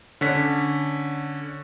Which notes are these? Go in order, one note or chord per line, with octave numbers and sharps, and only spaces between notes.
D3 C#4 B6